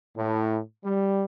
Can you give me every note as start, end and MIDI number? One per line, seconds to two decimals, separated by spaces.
0.16 0.59 45
0.84 1.24 55